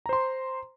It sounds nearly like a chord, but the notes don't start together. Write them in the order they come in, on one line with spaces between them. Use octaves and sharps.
A#5 C5 C6